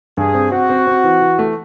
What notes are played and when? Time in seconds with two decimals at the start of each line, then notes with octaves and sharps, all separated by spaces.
0.17 G2 G#4
0.34 C4
0.51 C4 F#4
0.70 C4
0.87 C4
1.04 E3
1.21 E3
1.39 A3